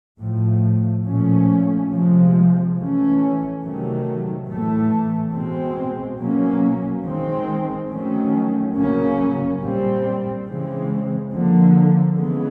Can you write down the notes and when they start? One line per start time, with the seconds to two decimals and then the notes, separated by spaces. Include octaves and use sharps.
0.20 A2 F3 A3
1.06 A#2 F3 A3 C#4
1.92 C3 F3 G#3
2.76 E3 A3 C#4
3.63 C3 D#3 F#3 A3
4.48 A2 E3 A3
5.33 B2 G#3 C4
6.19 B2 F#3 A#3 C#4
7.04 D#3 G#3 C4
7.91 D#3 F#3 A3 C#4
8.75 C#3 F#3 A#3 C#4
9.61 A#2 G3 C4
10.47 C#3 E3 G#3 C4
11.32 D3 F3 A#3
12.17 C#3 E3 G#3 B3